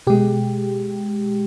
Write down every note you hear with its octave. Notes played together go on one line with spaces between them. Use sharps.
B2 G#3 G4